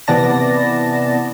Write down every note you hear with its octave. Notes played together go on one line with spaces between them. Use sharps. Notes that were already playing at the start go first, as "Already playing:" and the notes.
C3 E3 B3 D5 A5 A#6